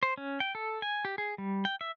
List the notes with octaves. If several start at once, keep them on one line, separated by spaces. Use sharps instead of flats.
C5
C#4
G5
A4
G#5
G4
G#4
G3
G5
E5